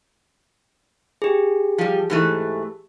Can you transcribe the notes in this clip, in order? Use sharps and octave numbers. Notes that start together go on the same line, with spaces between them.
G4 G#4
F3 G3
G#2 E3 A3